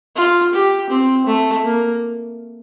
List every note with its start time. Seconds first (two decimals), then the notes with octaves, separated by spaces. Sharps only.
0.16 F4
0.53 G4
0.90 C4
1.27 A3
1.64 A#3